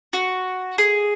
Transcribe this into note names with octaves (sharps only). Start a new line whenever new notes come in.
F#4
G#4